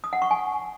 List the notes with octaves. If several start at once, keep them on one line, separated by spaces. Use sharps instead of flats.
D#6
F#5
C#6
G#5